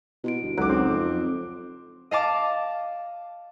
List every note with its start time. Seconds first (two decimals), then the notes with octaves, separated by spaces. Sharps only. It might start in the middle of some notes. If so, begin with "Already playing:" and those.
0.24 B2 E4 F#4 D7
0.43 G1
0.58 C#2 F#3 D#4 A4 D6 F#6
0.69 C4
0.90 F2
2.11 D#5 F5 A5 D6